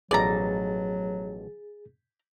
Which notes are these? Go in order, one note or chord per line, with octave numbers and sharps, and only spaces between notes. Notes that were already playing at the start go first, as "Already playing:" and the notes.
A1 B2 F3 F#3 G#4 D5 A#5 A6